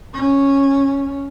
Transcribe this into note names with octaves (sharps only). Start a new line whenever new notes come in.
C#4